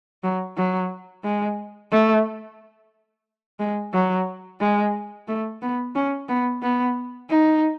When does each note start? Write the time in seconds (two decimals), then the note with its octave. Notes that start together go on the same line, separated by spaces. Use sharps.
0.23 F#3
0.57 F#3
1.24 G#3
1.92 A3
3.59 G#3
3.93 F#3
4.60 G#3
5.28 A3
5.62 B3
5.95 C#4
6.29 B3
6.62 B3
7.30 D#4